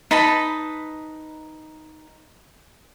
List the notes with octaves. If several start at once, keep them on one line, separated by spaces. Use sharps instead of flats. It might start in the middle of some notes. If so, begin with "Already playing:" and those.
D#4 B4 A5 B5